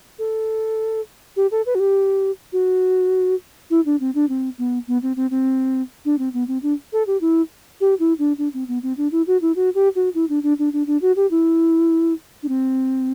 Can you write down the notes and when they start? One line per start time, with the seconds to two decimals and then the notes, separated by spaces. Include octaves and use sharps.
0.19 A4
1.36 G4
1.51 A4
1.66 B4
1.75 F#4
1.80 G4
2.53 F#4
3.70 E4
3.85 D4
4.00 C4
4.15 D4
4.29 C4
4.58 B3
4.88 B3
5.02 C4
5.16 C4
5.31 C4
6.05 D4
6.18 C4
6.33 B3
6.48 C4
6.63 D4
6.93 A4
7.07 G4
7.21 E4
7.80 G4
7.99 E4
8.19 D4
8.38 D4
8.54 C4
8.68 B3
8.83 C4
8.97 D4
9.12 E4
9.27 F#4
9.42 E4
9.56 F#4
9.75 G4
9.95 F#4
10.15 E4
10.29 D4
10.43 D4
10.59 D4
10.73 D4
10.87 D4
11.02 F#4
11.16 G4
11.31 E4
12.43 D4
12.48 C4